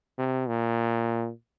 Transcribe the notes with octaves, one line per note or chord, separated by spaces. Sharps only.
C3
A#2